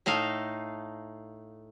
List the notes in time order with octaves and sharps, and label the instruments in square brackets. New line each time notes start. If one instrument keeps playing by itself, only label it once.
[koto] A2 A3 D#4 F5